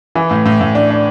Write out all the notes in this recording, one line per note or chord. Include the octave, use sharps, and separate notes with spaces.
E3
A2
A2
A2
D4
D4